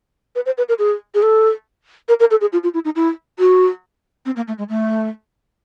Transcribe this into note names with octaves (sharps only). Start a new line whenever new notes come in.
B4
C5
B4
A#4
G#4
G#4
A4
A#4
A#4
A4
G#4
F4
F4
E4
D#4
E4
F#4
C4
A#3
A3
G#3
A3